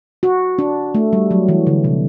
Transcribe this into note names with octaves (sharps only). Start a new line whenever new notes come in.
F#4
D4
A3
G3
F#3
E3
D3
C3